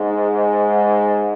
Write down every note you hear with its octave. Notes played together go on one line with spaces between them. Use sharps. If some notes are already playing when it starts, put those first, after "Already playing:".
Already playing: G#2 G#3 D#4